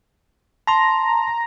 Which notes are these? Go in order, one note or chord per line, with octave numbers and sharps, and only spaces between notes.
A5 A#5 C6